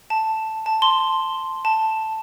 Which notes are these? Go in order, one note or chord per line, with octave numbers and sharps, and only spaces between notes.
A5
A5
C6
A5